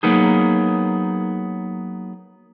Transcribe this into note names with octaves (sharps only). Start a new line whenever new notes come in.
F#3 A#3 B3 D#4 G#4